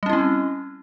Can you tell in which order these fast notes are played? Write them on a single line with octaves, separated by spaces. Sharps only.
G3 C#4 E4 C4